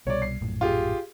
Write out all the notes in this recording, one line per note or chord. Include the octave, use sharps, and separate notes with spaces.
C2 B2 G3 C#5 D5
C7
A#1 F#2 A2
F4 G4 G#4